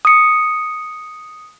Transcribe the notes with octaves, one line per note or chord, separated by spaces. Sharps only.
D#6 C#7